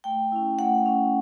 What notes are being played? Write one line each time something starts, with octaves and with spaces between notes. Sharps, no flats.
A3 G5
C#4 E4
A3 F#5
C#4 E4